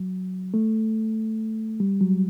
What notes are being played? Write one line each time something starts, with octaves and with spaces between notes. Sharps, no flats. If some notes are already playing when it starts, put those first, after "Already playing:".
Already playing: F#3
A3
G3
F#3